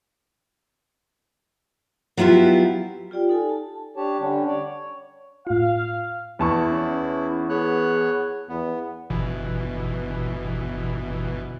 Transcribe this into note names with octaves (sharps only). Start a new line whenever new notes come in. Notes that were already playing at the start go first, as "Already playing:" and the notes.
F#3 B3 E4 F4 G4
F4 G4 D5 G5
D#4 A4 G#5
A5
D4 G4 C#5 A5
D3 G3 C#4 D4
C#5 D5
C#5
A2 F4 F5
E2 E4 A5 C#6
C#4
B3 G#4 C#5 F#6
E2 B3
G1 B2 E3